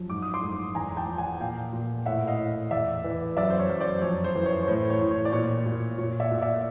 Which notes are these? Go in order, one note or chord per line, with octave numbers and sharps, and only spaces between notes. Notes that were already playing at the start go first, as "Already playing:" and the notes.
Already playing: F#2 F3
G#2 D6
D#6
C6 D6
G#2
E2 G#5 A#5
G5 A5
F3
F#5 G#5
A#2 F5 G5
A#2
A2 E5 F#5
D#5 F5
A2
E2 D5 E5
E3
F#2 D5 E5
C5
C#5
F#2
C5 D5
F2 C#5
C5
E3
C#5
C#5
A2 C5
C#5
A2
C#5
D5
A#2 C#5
A#2
A#2 C#5
D5 E5
A#2
D5 E5